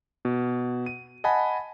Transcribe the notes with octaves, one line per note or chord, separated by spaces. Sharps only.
B2
D#7
D#5 F#5 G#5 A5 B5